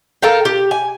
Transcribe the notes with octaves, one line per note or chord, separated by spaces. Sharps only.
A4 A#4 F5 G5
G4
G#5